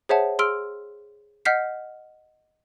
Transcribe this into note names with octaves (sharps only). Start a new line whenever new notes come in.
G#4 C5 C#5 E5 F#5 A5
G#4 C6 E6 F6 D7
D#5 F#5 F6 G6 B6 C7